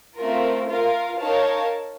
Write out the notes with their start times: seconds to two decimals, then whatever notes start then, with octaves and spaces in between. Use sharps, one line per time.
0.16 A3 C4 F4 A#4
0.68 F4 A#4 F5
1.18 D#4 A#4 C#5 F5 A5